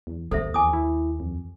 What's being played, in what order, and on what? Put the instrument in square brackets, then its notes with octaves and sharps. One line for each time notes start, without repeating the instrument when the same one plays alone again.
[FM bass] E2
[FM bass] G#1 [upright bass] D#2 [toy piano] A4 C5 E5
[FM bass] E2 [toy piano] G#5 D6 D#6
[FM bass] E4
F2